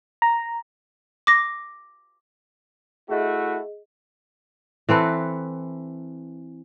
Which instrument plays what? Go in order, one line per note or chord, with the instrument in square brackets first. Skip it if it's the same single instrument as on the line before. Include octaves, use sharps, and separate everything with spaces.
[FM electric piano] A#5
[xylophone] D6 A#6
[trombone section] A3 E4 F#4 [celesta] G#4 D#5
[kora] E3 C4 A4 B4